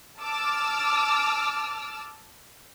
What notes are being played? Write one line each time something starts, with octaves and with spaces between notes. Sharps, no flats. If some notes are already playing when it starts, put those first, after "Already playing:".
A5 D6 E6 F6